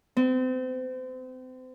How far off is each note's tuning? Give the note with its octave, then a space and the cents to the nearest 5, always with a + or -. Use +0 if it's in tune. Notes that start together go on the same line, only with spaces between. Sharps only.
C4 -35